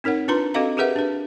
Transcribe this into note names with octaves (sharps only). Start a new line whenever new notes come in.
C4 D#4 A#4 C#5 F#5
D4 F4 B4 A#5 C6
C4 F#4 A4 D#5 F5 A#5
G4 G#4 A#4 B4 E5 F#5
D4 B4